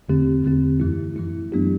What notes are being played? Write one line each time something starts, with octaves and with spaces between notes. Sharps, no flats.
E2 D3 A3 C4 G4
E2 D3 A3 C4 G4
F#2 E3 A3 E4
F#2 E3 A3 E4
F#3 B3 D4 G4